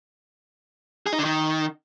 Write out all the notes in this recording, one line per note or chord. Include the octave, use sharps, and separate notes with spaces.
G#4
D#4
D3
D#3